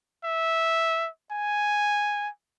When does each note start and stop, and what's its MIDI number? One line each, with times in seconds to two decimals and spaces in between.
0.24 1.09 76
1.32 2.28 80